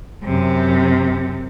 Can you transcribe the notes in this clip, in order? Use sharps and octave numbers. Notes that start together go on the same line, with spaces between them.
F#2 C3